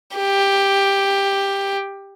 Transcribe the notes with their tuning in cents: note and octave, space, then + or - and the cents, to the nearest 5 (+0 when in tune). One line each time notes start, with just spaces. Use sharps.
G4 +10